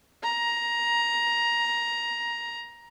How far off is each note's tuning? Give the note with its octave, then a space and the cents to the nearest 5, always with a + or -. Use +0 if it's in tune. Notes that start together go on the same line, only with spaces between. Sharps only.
A#5 +15